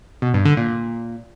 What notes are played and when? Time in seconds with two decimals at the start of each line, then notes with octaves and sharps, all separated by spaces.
0.22 B2
0.34 G2
0.45 D3
0.57 A#2
0.68 A#2